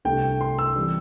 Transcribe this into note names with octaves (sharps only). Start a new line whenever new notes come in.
C2 C3 A3 D4 G5
C6
E6
C3 E3 G3